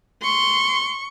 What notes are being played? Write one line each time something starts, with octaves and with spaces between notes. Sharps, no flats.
C6 C#6